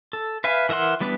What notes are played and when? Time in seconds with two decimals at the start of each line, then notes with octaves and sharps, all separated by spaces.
0.13 A4
0.44 B4 E5 F5 G#5
0.69 E3 A#4 E5 F#5 C6
1.00 E3 G3 B3 D4 B4